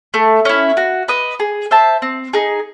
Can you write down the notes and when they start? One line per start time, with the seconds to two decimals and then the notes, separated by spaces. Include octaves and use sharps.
0.14 A3
0.45 C#4 E4
0.77 F#4
1.08 B4 D#5
1.40 G#4
1.71 C5 E5 A5
2.02 C4
2.33 D#4 G#4